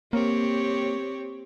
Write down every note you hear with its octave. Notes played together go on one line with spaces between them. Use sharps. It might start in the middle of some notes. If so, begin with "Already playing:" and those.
A#3 C4 G4 C#5